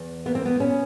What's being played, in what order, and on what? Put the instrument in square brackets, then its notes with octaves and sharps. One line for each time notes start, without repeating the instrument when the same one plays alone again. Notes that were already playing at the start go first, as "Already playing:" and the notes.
Already playing: [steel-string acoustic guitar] E2
A#3 B3
C4
B3
A#2 B3 C#4